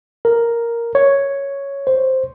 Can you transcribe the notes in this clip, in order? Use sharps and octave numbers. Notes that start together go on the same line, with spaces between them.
A#4
C#5
C5